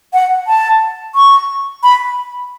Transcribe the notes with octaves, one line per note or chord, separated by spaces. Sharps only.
F#5
A5
C#6
B5